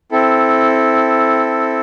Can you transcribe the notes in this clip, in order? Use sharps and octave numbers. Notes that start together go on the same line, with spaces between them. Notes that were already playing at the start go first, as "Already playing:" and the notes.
C4 E4 A4